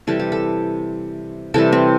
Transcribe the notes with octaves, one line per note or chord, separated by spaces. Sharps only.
C3 E3 G3 A4
G4
A4
C3 E3 G3 A4
C4